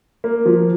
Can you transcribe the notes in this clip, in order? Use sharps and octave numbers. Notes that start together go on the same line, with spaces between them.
A#3
F3